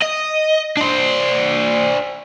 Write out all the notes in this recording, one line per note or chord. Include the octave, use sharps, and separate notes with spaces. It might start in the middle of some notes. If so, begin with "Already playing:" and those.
D#5
D4 C5